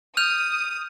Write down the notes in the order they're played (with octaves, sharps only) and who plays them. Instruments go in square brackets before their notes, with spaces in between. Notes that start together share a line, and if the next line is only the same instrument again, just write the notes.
[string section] D#6 [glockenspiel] F6 G6 F7